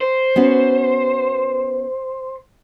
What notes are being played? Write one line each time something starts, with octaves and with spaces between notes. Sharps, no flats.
C5
B3 C#4 F#4